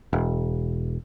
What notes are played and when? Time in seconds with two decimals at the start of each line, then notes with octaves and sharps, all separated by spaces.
0.13 E1